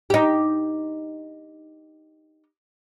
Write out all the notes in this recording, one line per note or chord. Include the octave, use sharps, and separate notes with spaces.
D#4 G4